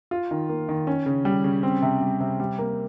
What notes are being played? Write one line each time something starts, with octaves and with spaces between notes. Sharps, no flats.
F4
D#3
A#3
D#3
C#4
C#3
G3
C#3
C4
C3
G3
C3
G3
A#3